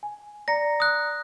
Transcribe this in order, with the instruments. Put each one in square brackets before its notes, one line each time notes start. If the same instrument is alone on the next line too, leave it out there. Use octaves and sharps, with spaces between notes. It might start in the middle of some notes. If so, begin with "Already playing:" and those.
[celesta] G#5
[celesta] D5 A#5 C#7 [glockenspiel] A#6
[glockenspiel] D#6 F#6